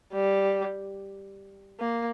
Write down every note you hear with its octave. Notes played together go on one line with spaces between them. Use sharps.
G3
A#3